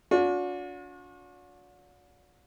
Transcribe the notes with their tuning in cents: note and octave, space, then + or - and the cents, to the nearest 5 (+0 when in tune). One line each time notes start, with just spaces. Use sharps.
D4 -40 F#4 -45